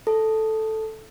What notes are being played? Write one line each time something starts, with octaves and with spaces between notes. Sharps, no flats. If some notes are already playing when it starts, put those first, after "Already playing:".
A4